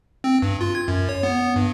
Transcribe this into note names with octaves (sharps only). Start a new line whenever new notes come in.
C4
G2
F4
G#6
F#2
C#5
B3
G2